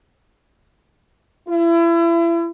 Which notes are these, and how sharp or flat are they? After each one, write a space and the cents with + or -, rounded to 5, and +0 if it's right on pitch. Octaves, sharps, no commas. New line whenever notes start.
E4 +35